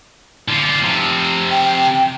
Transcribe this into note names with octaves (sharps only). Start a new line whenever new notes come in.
D3 F4
C3 F3
G5